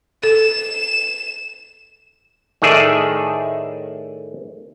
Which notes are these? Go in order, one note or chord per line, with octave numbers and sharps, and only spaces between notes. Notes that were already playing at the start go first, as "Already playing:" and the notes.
A4 E7
A2 D#3 A3 G#4 D5 E5